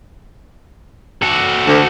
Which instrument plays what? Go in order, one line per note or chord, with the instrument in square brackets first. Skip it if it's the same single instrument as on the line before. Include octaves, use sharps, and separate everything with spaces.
[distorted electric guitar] F#4 A4
[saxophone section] D2